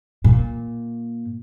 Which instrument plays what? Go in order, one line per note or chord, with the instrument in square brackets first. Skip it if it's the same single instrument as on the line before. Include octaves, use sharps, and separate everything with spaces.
[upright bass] A#2